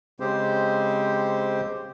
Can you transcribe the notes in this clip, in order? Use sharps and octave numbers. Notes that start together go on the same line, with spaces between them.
C#3 G#3 C4 G4 C5